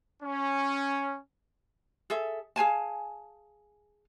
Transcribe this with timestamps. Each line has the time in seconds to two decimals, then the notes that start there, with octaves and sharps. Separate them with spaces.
0.23 C#4
2.10 G#4 A4 E5
2.56 G#4 F5 G#5 A5